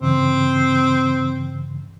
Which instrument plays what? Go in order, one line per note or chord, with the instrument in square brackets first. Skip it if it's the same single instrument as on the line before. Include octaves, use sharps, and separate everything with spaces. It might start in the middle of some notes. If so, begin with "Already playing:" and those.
[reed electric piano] G2 C#3 E3 [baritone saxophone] C4